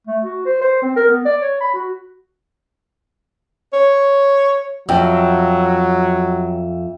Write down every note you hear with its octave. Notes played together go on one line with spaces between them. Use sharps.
A3
F#4
C5
C5
C4
A#4
B3
D5
C#5
B5
F#4
C#5
F2 F#3 E5 G5